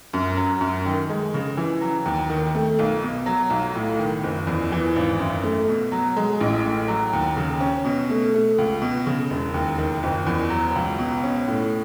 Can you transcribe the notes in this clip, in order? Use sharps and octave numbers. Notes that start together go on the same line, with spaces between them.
F#2
F#3
F#2
D#3
G#3
C#3
E3
F#3
D#2
D#3
A3
B1
B2
F#3
B1
A2
D#3
F#1
E2
E3
G#1
F#2
A3
B2
F#3
G#3
A1
A2
F#3
D#2
C#3
C#4
B2
A3
A3
C#2
B2
C#3
E1
D#2
D#3
F#1
E2
F#3
C#2
B2
C#4
A2